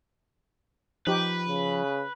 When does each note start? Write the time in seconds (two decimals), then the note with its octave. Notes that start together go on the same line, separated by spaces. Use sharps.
1.07 F3 D#4 G4 B4
1.49 C#3